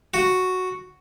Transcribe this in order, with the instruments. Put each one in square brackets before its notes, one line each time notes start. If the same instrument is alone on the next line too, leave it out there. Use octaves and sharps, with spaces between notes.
[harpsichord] F#4